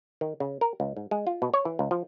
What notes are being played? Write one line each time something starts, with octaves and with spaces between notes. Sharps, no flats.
D#3
C#3
A#4
C#2
G#2
G#3
F4
B2
C#5
E3
C#2
F3